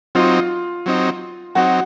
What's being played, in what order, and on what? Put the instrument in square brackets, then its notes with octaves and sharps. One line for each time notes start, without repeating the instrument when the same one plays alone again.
[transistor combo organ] F#3 C4 D#4 [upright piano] F4
[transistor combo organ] F#3 C4 D#4
[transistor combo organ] F#3 C4 D#4 [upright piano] F#4